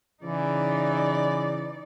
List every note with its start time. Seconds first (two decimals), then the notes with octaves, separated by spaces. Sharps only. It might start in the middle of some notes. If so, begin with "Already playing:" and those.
0.23 C#3 E3 D#4 D5